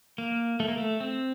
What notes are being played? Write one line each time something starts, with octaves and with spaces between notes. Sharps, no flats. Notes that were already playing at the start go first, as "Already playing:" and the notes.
A#3
A3
A#3
A3
C4